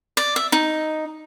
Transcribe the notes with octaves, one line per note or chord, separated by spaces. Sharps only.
D5
E5
D#4